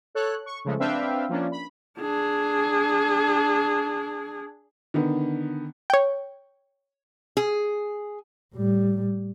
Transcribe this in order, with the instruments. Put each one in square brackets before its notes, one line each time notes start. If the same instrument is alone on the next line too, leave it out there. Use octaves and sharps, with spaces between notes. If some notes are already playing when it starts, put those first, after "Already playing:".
[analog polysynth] A4 C#5 F#6
C#6
C#3 F3 G#3 A3
C4 D4 B4 E5 F5 G5
F3 A#3 C#4 D4
B5
[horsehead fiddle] D4 G#4
[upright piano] D3 D#3 B3
[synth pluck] C#5 G5
[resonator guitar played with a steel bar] G#4
[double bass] A2 G3